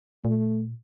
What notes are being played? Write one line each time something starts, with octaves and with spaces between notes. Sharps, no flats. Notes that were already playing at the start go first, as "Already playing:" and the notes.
A#2 A3